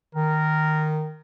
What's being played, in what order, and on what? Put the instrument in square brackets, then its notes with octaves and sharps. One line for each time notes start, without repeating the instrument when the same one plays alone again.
[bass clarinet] D#3 [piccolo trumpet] A#4